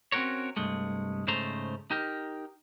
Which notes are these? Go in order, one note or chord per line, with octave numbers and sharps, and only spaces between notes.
C4 C#4 F#4 A#4 C#5
C2 G2 G#3 A3
G#2 C#3 A3 C5 A#5
D#4 G4 A#4